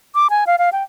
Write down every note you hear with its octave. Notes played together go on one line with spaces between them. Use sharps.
D6
G#5
F5
F5
G5